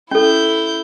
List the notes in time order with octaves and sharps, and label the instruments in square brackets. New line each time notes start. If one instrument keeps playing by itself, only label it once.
[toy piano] C#4 A4 [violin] E4 G6